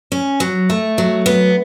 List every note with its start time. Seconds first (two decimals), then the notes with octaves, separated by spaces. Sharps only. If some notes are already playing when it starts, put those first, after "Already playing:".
0.12 C#4
0.40 F#3
0.70 A3
0.98 F#3
1.26 B3